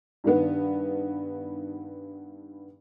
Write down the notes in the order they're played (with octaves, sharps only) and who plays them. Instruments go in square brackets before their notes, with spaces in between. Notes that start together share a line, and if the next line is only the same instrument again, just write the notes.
[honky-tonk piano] G2 D#3 B3